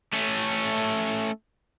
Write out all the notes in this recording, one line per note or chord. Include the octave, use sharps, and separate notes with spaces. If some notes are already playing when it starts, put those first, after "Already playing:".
A3 C#4